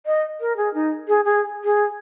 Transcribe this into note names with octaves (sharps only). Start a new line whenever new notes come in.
D#5
A#4
G#4
D#4
G#4
G#4
G#4